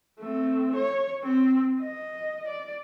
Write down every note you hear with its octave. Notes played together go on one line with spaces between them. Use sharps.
A3 C4
C#5
C4
D#5
D5